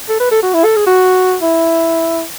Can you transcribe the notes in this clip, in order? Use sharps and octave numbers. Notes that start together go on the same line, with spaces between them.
A4
B4
A4
F#4
E4
A4
G#4
F#4
E4